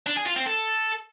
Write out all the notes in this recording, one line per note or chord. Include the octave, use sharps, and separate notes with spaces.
D4
G#4
F4
C4
A4